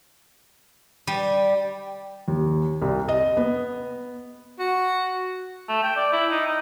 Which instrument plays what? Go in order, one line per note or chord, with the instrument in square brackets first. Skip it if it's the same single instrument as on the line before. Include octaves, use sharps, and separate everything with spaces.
[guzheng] G3
[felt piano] D#2
C2
D#5
B3
[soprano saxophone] F#4
[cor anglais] A3
G5
D5
E4
D#4
D#4